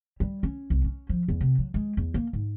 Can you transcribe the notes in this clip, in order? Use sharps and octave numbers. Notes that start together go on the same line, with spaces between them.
G3
C#4
C2
C#4
F3
E2
C3
F#3
G#3
E2
A#3
G#2